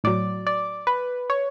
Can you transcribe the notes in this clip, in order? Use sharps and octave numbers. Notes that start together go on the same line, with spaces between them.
A2 F#3 D5
D5
B4
C#5